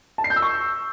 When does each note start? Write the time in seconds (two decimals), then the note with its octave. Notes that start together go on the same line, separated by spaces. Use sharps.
0.18 A5
0.24 C7
0.30 G6
0.36 E6
0.42 C#6